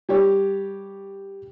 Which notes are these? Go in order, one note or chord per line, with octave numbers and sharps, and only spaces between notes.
G3 G4 C#5